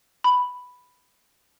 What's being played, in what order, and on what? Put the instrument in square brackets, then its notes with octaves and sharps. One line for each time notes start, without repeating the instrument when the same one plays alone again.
[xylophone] B5